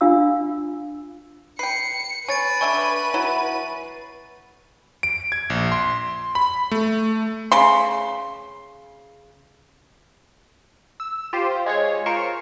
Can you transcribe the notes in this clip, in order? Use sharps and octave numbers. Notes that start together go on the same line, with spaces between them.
D4 F4 F5 B5 E6
B4 G5 C7 C#7
B4 C#5 G#5 A6 D7 D#7
D3 E5 G#5 C#6
F#3 E4
D7
G#6
A#1
C6
B5
A3
C#3 C6
E6
F4 G4 C5
G#3 G#4 C#5
F4 A#4 C5 C#6